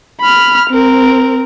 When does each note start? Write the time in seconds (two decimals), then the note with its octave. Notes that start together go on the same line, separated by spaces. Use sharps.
0.21 B5 F6
0.70 C4 A#4